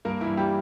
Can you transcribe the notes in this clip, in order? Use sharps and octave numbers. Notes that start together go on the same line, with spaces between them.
G2 A#3 A#4
E3 E4
G2
G3 G4